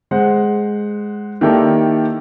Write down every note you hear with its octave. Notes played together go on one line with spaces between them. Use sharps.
G#3 C5 F#5
D#3 A#3 E4 G4 A4 D5